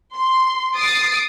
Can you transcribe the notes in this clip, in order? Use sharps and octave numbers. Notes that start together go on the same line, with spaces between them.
C6
D#6 A6 C7 D7